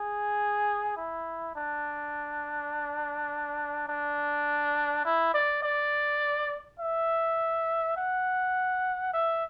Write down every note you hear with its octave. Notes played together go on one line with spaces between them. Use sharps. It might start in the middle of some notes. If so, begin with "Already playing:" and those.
Already playing: G#4
E4
D4
D4
E4
D5
D5
E5
F#5
E5